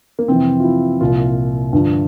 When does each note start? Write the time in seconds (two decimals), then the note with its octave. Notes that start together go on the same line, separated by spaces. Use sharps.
0.19 A#3
0.28 F2 C3 E3 C4
0.60 F4
0.64 E4
1.01 C2 A#2 F3 F4
1.73 G2 D3 F3